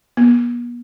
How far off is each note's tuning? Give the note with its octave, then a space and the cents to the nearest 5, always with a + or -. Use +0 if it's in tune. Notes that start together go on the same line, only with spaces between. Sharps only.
B3 -45